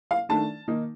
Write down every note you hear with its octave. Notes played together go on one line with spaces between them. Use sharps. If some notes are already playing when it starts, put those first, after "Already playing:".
F5
D#3 A3 D4 A5
D#3 A#3 D#4